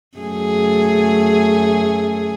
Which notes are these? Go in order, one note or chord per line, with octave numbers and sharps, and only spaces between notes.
F#2 A3 G#4